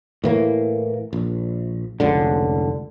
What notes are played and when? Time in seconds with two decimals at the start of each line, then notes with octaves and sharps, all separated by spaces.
0.24 A2 E3 A#3
1.13 A#1
2.00 F1 C#2 D3